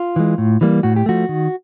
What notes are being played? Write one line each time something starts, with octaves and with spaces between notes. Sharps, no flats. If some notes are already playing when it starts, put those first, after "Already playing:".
Already playing: F4
E3 G#3
A2
E3 G3 A#3
A2 F#4
G4
F3 A3 F#4
D#3